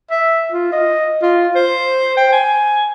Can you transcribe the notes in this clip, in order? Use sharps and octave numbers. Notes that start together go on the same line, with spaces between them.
E5
F4
D#5
F4
C5
G5
G#5